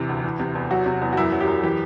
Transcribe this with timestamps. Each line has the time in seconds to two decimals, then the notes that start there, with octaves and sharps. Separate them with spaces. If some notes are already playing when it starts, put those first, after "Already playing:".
Already playing: E2 C3 E3
0.09 D2
0.24 E3
0.40 C3
0.55 E2
0.71 F#3 F#4
0.86 C3
1.01 E2
1.13 F#4
1.17 F#2 E4
1.32 F#3
1.41 G4
1.47 F#2
1.63 E3 G4